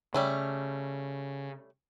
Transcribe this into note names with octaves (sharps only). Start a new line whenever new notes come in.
C#3 G3 A3 C#4